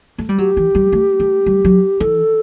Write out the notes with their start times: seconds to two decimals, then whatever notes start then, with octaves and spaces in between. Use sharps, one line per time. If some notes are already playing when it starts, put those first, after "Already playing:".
0.18 A3
0.29 G3
0.38 F#3 G4
0.57 E3
0.75 G3
0.92 A3
1.20 A3
1.46 G3
1.65 F#3
2.00 E3 A4